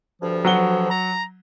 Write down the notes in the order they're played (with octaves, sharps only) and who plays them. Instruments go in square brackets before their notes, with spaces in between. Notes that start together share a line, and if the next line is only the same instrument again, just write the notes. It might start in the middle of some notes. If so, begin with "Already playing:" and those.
[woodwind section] D2 G2 F3
[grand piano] F#3 F#5 G7
[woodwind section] A#5